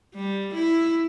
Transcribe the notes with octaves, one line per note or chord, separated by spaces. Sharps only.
G3
E4